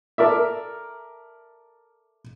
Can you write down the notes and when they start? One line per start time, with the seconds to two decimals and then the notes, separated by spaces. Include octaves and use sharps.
0.18 A4 A#4 D5 E5